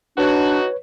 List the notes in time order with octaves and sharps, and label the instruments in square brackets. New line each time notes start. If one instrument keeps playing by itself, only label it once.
[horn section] E3 D#4 F#4 [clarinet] D4 [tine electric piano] B4 C#5